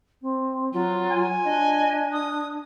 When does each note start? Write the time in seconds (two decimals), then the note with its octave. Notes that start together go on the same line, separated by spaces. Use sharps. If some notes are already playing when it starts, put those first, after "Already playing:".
0.21 C4
0.73 F#3 F4
1.11 G#5
1.44 D4 D#5
2.12 D#6